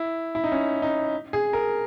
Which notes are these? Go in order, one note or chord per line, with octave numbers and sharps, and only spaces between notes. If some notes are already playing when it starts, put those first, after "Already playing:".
Already playing: E4
E4
D#4
C#4
D#4
G#4
A#4